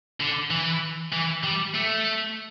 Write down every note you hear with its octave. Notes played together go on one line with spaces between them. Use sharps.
D3
E3
E3
G3
A3